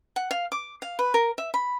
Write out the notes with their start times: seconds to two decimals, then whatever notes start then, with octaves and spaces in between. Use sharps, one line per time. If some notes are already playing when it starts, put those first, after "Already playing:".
0.16 F#5
0.31 F5
0.52 D6
0.82 F5
0.99 B4
1.14 A#4
1.38 E5
1.54 B5